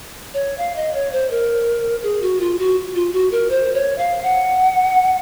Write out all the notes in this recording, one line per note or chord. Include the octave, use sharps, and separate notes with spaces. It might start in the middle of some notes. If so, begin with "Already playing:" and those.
C#5
F5
D#5
C#5
C5
A#4
G#4
F#4
F4
F#4
F4
F#4
A#4
C5
C#5
F5
F#5